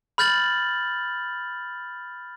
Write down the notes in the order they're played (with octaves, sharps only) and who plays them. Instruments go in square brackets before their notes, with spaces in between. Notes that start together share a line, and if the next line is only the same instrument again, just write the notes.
[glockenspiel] B5 F6 G6 A6 F#7